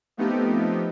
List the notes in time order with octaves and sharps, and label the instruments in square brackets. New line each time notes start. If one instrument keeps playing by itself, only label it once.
[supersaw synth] F3 A3 B3 C4 D#4 G4